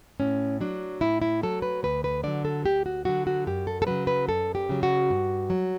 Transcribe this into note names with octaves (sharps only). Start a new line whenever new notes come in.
A2 C#4
F#3 D4
A2 E4
E4
F#3 A4
B4
D2 B4
B4
D3 F#3 D5
A4
D2 G4
F#4
D3 F#3 F#4
F#4
F#2 G4
A4
A4
C#3 F#3 B4
B4
F#2 A4
G4
C#3 F#3
F#4
G2
F#3